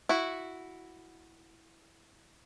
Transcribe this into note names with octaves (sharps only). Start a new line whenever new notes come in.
E4 F#4